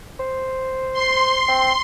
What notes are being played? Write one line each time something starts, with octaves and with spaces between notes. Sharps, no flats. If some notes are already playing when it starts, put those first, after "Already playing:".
C5
C6
C4